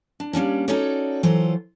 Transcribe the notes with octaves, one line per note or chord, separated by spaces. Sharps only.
D4
G3 A#3 C#4 D4
C#4 D#4 F#4 A4 C#5 D5
E3 F#3 F4 A4 C5